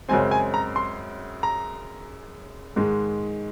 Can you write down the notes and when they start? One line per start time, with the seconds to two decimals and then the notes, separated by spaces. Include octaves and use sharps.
0.09 F#2 C#3 G#3 C4 G#5
0.31 G#5
0.54 A#5
0.76 C6
1.43 A#5
2.76 G#2 D#3 G#3